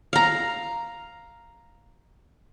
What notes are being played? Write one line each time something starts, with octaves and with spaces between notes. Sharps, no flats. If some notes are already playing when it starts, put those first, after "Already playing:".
F5 A#5